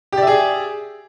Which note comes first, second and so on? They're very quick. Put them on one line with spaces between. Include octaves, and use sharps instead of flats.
G4 D5 E5 G#4